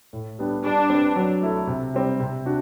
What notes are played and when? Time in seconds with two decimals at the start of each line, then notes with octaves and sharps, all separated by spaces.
0.13 A2
0.39 G3 B3 D4 G4
0.64 G3 D4
0.90 C4 G4 B4
1.16 F#3
1.42 A3 E4 A4
1.67 C3
1.94 G3 C4 G4
2.20 C3
2.46 D4 F#4